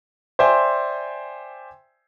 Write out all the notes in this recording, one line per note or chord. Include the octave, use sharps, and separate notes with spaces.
C5 D5 E5 G5 G#5 C6